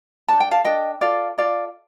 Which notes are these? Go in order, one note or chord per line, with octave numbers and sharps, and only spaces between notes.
D4 A4 A5
G5
F5 A5
D4 A4 D#5 G5
F4 A4 D5 F5
F4 A4 D5 F5